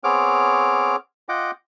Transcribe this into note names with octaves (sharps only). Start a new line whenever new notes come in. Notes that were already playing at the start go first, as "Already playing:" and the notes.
B3 C4 G#4 C#5 D6 F6
F4 D#5 F#5 G5 D6